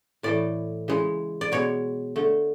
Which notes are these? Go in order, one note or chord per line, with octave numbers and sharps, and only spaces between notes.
A2 E3 A3 D5
C#3 E3 G#3
D5
B2 G#3 C#5
D3 A3